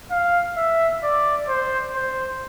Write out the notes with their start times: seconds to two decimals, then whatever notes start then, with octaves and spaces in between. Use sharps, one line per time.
0.11 F5
0.57 E5
1.03 D5
1.48 C5
1.95 C5